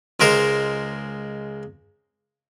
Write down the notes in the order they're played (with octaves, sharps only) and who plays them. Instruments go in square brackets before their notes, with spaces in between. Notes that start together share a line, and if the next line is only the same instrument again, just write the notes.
[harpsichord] C#2 G#3 A#4 C5